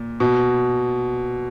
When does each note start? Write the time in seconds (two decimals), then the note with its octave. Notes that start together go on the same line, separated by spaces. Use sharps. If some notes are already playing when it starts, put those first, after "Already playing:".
Already playing: A#2
0.20 B2